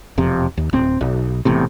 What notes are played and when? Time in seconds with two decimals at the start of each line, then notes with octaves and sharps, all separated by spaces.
0.18 E1 F2 C3
0.57 D#2
0.73 D1 C4
1.01 B1
1.45 E1 E2 A2 C3